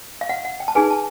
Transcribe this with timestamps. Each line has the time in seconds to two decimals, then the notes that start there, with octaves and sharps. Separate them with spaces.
0.21 F5
0.29 F#5
0.45 F#5
0.60 G5
0.68 A5
0.75 D#4 G#4 B4 G#5
0.91 A5